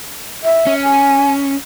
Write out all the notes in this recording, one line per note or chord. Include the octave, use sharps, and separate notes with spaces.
E5
C#4
G#5